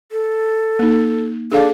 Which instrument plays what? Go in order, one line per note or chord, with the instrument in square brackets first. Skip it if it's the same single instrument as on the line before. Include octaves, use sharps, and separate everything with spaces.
[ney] A4
[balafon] A#3 D#4
[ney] D4 [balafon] G#4 A4 F5